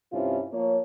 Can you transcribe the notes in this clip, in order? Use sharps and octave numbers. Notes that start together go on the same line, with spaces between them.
G2 C3 C4 C#4 E4 F4
F3 A#3 F4 C#5